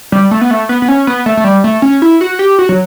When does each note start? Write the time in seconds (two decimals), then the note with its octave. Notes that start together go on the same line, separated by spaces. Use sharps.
0.12 G3
0.31 A3
0.41 B3
0.51 A3
0.69 B3
0.82 B3
0.88 C#4
1.07 B3
1.26 A3
1.37 A3
1.44 G3
1.64 A3
1.82 C#4
2.02 E4
2.21 F#4
2.39 G4
2.59 F#4
2.69 F#3